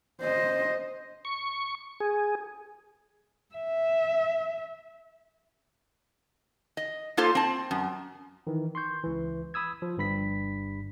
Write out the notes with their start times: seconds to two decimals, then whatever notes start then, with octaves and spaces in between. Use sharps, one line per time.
0.22 C5 D#5
1.25 C#6
2.00 G#4
3.55 E5
6.77 D#5
7.17 A#3 F4 A4 C5
7.35 C4 A5
7.71 F#2
8.47 D#3 E3
8.75 C6 C#6 G6
9.04 C#2 E3
9.54 B5 D#6 E6 G#6
9.82 F3
9.97 G1 G2 B5 B6